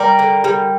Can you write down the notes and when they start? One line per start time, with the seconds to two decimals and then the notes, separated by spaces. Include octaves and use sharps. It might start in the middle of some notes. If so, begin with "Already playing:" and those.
Already playing: G3 A#4 D5
0.19 D3
0.44 G3